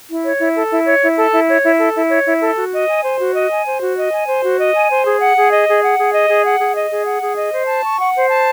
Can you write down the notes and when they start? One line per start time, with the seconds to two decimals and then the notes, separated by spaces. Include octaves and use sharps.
0.08 E4
0.23 C#5
0.39 E4
0.55 A4
0.71 E4
0.85 C#5
1.01 E4
1.16 A4
1.32 E4
1.48 C#5
1.64 E4
1.79 A4
1.94 E4
2.09 C#5
2.25 E4
2.41 A4
2.56 F#4
2.71 D#5
2.87 G#5
3.03 C5
3.18 F#4
3.34 D#5
3.48 G#5
3.65 C5
3.80 F#4
3.96 D#5
4.11 G#5
4.26 C5
4.41 F#4
4.58 D#5
4.74 G#5
4.88 C5
5.03 G#4
5.19 F#5
5.35 G#4
5.51 D#5
5.67 G#4
5.81 F#5
5.98 G#4
6.12 D#5
6.28 G#4
6.44 F#5
6.58 G#4
6.74 D#5
6.90 G#4
7.05 F#5
7.22 G#4
7.36 D#5
7.52 C5
7.67 A5
7.84 C#6
7.99 F#5
8.14 C5
8.29 A5